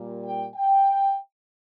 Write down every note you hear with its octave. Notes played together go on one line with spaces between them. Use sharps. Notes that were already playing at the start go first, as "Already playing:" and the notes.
Already playing: A#2 G3 A#3
G5
G5